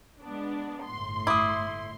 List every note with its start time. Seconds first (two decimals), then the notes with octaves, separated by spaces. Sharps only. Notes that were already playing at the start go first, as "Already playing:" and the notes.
0.22 G#3 B3 D4
0.85 G1 A2 C6
1.27 E4 D6 D#6